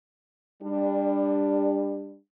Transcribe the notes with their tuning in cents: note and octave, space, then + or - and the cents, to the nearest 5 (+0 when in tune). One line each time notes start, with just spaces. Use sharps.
G3 +25 D4 +5